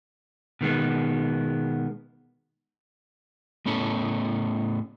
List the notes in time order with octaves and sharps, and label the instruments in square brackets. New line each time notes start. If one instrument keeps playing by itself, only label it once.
[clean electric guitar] B2 D#3 G#3 B3
[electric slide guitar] A2 B3 C#4 A4